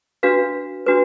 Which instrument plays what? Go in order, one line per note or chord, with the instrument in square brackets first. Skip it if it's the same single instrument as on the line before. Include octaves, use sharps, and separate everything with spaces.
[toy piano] D4 F#4 B4 F5
D4 F#4 B4